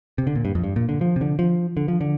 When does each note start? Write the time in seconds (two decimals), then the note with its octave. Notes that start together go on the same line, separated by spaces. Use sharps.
0.18 C3
0.27 D3
0.35 A#2
0.45 G2
0.55 F2
0.64 G2
0.76 A#2
0.89 D3
1.01 F3
1.16 C3
1.21 D3
1.39 F3
1.77 D3
1.88 F3
2.01 D3